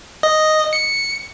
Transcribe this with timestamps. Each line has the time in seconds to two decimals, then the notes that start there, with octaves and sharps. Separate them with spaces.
0.23 D#5
0.73 C#7